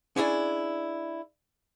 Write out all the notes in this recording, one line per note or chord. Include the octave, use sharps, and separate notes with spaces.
C#4 D4 E4 G#4 D5